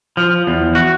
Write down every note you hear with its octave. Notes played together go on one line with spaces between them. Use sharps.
F3
E2
F#4